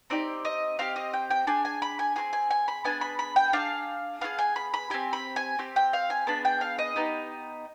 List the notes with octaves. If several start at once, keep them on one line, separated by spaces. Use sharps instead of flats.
C4 D#4 G4 D5
D#5
C4 G4 F5
D#5
G5
G5
D4 G#4 G#5
G#5
B5
G#5
C4 F4 G#4 G#5
G#5
G#5
B5
B3 D4 G#4 G#5
B5
B5
G5
D4 F4 G#4 F5
B3 F4 G#4 F5
G#5
B5
B5
C4 G4 G#5
B5
G#5
C4 G4
G5
F5
G#5
B3 D4 G#4 B5
G5
F5
D#5
B3 D#4 G4